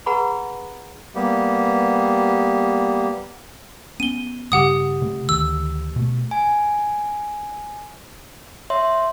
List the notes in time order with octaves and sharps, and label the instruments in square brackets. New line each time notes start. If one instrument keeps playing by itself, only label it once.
[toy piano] G#4 B4 F#5 A#5 B5 C#6
[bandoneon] G3 A#3 B3 G4
[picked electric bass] B3 C#4 [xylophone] D#7 G7
[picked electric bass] G2 C#3 [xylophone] G4 F#5 D#6
[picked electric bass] C3 A3
[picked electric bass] D2 D#3 [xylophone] E6
[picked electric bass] B2 A3
[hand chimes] G#5
C#5 E5 C6